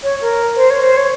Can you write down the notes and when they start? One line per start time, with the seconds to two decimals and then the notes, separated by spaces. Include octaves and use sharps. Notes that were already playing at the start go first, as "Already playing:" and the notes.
0.03 C#5
0.21 A#4
0.56 C5
0.70 C#5
0.83 C5
0.97 C#5